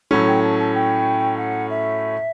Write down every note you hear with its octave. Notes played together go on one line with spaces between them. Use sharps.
A2 F#3 A3 C#4 A4
G5
A5
A5
G5
F#5
E5